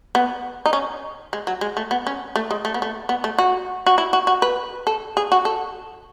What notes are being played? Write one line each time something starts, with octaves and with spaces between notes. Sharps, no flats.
B3
D#4
C#4
G#3
F#3
G#3
A3
B3
C#4
A3
G#3
A3
B3
A3
B3
A3
F#4
F#4
E4
F#4
F#4
B4
A4
G#4
F#4
A4